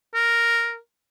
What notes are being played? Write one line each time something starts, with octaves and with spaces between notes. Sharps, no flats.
A#4